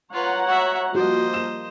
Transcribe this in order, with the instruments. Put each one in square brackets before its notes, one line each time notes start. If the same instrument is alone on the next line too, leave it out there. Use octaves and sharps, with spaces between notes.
[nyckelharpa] F4 B4 [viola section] C#5 F#5 A#5
[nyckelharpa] F#4 E5
[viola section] F3 G3 A#3 [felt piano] F#4 [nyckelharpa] C5 D#5
[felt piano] E7